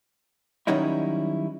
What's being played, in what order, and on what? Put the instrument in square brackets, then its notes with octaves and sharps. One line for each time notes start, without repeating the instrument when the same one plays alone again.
[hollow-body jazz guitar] D#3 F#3 G3 C#4 D#4 E4